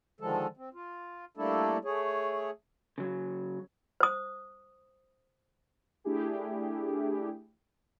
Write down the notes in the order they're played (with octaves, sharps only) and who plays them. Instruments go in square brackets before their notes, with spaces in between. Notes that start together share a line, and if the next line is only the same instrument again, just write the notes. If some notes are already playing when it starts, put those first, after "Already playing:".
[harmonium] D3 D#3 F3 G#3 A4
C4
F4
G3 A3 A#3 D4 E4 A4
A3 G#4 C#5
[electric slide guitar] C#3 F#3
[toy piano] C5 D#6
[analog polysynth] A3 D4 E4 G4 G#4